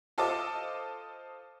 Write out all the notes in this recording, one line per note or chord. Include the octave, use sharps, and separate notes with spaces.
F4 A4 C5 D#5 A5 D6